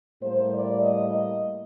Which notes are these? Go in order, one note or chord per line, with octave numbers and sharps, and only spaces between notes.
A2 G3 A#3 C5
D5
D#5